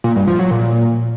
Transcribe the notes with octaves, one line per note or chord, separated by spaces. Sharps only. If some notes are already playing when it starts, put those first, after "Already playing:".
A#2
G2
F3
F#3
A#2